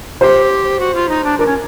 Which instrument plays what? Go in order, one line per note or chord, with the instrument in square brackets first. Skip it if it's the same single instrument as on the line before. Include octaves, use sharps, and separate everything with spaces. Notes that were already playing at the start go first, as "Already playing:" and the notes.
[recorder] G4 [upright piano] C5
[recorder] F#4
F4
D#4
D4
[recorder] D4 [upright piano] A#4
[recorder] C#4